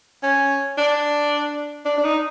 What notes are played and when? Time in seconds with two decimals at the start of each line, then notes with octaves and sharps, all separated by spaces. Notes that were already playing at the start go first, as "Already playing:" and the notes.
0.23 C#4
0.78 D4
1.85 D4
1.98 D4
2.04 D#4